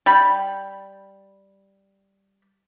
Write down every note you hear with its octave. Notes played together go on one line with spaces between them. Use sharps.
G3 B5